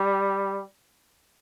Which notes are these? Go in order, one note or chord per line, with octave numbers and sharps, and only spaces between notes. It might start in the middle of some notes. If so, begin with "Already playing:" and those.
Already playing: G3